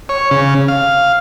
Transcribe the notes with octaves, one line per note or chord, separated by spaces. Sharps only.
C#5
C#3
F5